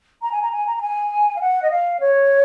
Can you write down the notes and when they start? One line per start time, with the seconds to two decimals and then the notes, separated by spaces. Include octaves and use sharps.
0.22 A#5
0.32 G#5
0.42 A#5
0.52 G#5
0.67 A#5
0.77 A#5
0.82 G#5
1.36 F5
1.41 F#5
1.62 D#5
1.71 F5
2.00 C#5